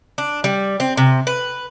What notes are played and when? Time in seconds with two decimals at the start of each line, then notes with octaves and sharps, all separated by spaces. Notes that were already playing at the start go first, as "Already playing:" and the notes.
0.18 D4
0.44 G3
0.80 C4
0.97 C3
1.27 B4